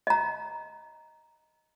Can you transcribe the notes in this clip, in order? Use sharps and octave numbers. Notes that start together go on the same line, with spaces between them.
D#5 A#5